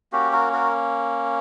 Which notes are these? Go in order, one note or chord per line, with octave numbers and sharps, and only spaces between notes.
A#3 C#4 F#4 G4
F#4 A#4
F#4 A#4